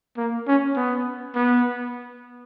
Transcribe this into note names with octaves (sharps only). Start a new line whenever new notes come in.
A#3
C#4
B3
B3